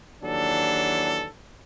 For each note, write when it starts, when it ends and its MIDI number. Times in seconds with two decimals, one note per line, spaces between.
0.23 1.28 39
0.23 1.28 52
0.23 1.28 54
0.23 1.28 62
0.23 1.28 69